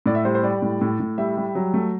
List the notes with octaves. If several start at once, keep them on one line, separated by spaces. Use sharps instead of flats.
A2 D5
E5
G3 C5
C5
G3 D5
A2
A2
A2
G3 E5
G3
F#3
A3